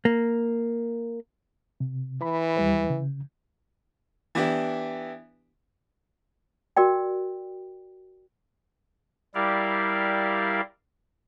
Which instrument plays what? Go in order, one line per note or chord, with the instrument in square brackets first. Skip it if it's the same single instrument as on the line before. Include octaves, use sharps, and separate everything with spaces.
[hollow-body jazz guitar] A#3
[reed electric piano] C3
[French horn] E3 [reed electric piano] B5
[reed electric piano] D#2 G3 B4
C#3
[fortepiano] E3 B3 D4 E4 G4
[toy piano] F#4 A#4 D5 G5
[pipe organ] G3 E4 G4 A#4 D5 F5